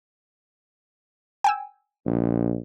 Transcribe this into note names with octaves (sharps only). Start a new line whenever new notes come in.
G5 G#5 E6
A#1